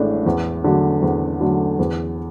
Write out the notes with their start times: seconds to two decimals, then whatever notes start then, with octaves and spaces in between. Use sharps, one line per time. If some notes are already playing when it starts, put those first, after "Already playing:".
Already playing: A1 A2 G#3 D4
0.26 E2
0.64 D3 F#3 A3
1.02 E2
1.40 D3 F#3 A3
1.79 E2